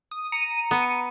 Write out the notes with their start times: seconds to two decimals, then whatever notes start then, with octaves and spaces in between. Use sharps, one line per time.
0.11 D#6
0.32 A#5 C#7 D#7
0.71 B3